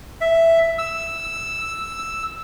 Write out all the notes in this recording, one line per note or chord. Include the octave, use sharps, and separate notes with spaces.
E5
E6